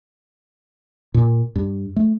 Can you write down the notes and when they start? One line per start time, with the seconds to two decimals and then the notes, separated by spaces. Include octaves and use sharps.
1.14 A#2
1.56 G2
1.96 A3